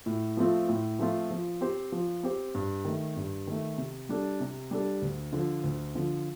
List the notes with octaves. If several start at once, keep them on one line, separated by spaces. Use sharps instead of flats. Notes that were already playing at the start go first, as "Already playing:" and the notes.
A2
F3 A3 C4 F4
A2
F3 A3 C4 F4
F3
C4 G4 C5
F3
C4 G4 C5
G2
D#3 A3
G2
D#3 A3
C3
G3 D4 A4
C3
G3 D4 A4
D2
D3 F3
D2
D3 F3